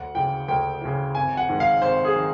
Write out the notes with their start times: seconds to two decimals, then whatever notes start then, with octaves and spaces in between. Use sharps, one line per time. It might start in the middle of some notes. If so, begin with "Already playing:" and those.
Already playing: D2 F#5
0.15 C#3 E3 G5
0.48 D2 G5
0.82 C#3 E3
1.15 G#1 G#5
1.37 F#5
1.49 G#2 D#3
1.60 F5
1.82 G#1 C5
2.05 G#4
2.16 D#3